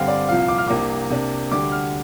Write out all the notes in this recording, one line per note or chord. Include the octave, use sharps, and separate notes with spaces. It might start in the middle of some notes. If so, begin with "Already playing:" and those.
Already playing: G2 D3 G3 C4 F5
D5
C2 A#2 F3 F5
D6
F6
C2 C3 A#3 D4 D6
C3 A#3 D4
D2 D3 G3 D6
F6